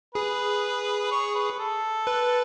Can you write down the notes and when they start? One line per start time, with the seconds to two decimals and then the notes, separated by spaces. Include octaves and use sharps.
0.15 G#4 B4
1.11 C#5
1.35 B4
1.59 A4
2.07 B4